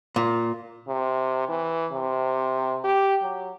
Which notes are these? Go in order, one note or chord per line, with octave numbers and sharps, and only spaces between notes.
A#2
C3
E3
C3
G4
F#3